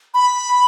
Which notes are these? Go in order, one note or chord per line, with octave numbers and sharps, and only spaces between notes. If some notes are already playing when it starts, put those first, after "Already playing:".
B5